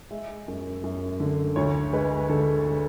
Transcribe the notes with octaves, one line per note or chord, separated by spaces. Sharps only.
G#3 E5
F#2
F#2
D3
D2 C#5
G#3 B4
D3 A4
D3